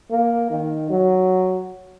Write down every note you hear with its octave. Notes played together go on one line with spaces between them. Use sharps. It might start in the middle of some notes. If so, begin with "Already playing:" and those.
A#3
D#3
F#3